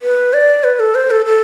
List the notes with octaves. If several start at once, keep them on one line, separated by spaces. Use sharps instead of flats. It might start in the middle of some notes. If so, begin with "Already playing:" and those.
B4
D5
B4
A4
C5
A4
A4